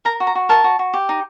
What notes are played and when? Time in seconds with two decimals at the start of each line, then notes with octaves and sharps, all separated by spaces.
0.05 A#4 A#5
0.20 F#4
0.27 A#5
0.35 F#4
0.49 A#4 A5
0.64 F#4
0.79 F#4
0.94 G4
1.09 D#4